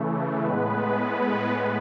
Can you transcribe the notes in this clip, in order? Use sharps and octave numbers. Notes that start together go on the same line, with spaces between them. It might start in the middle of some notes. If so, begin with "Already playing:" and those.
Already playing: C#3 E3 A3
A2 G#3 B3 B4